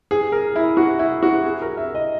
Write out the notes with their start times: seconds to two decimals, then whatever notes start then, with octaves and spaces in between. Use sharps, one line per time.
0.11 G#4
0.32 A#4
0.56 E4
0.77 F#4
0.99 E4
1.23 F#4
1.44 G#4
1.62 A#4
1.77 E5
1.95 D#5